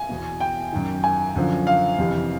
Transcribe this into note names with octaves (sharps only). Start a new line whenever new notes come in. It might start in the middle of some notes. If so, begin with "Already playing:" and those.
Already playing: G#5
E2 B2
G5
F#2 D#3
G#5
F#2 D3 F3
F5
F2 C3 E3